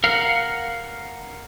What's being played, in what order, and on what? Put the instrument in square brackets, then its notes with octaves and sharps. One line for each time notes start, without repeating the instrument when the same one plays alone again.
[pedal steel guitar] A#4 F5 F#5